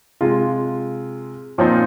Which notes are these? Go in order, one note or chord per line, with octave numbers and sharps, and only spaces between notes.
C3 G#3 F4
A#2 F3 C4 D#4